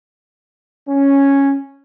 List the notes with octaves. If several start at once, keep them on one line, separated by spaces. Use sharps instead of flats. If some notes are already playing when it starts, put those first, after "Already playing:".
C#4